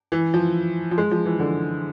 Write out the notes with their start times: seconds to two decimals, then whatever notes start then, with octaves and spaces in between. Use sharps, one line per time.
0.12 E3
0.34 F3
0.91 F3
0.98 G#3
1.11 F3
1.26 E3
1.40 D3